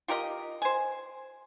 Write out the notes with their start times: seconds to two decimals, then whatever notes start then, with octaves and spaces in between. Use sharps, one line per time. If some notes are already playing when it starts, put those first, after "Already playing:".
0.08 F4 G4 A#4 D#5
0.62 C5 G#5